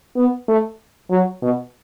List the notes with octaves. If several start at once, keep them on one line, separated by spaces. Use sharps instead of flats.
B3
A3
F#3
B2